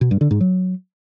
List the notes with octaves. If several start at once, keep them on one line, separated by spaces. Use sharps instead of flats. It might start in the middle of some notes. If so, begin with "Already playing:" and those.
B2
G2
D3
G#2
F#3